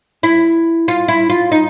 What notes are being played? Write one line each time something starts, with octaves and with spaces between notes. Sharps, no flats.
E4
F4
E4
F4
D#4